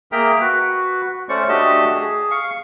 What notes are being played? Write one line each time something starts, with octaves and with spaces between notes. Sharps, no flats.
A#3 G#4 A#4 E5 G5 A#5
F#4 B4
A3 C#4 C5 D5 C#6
A3 D4 F#4 G4 D#5 A5
G#4
F5 C#6